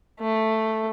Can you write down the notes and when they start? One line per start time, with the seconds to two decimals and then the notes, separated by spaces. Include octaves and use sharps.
0.20 A3